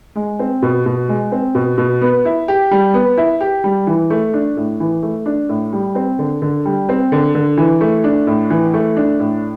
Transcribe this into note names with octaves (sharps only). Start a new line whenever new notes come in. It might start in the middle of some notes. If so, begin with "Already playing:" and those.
G#3
C4
B2
B2
G#3
C4
B2
B2
B3
E4
G4
G3
B3
E4
G4
G3
E3
A3
D4
A2
E3
A3
D4
A2
G3
C4
D3
D3
G3
C4
D3
D3
E3
A3
D4
A2
E3
A3
D4
A2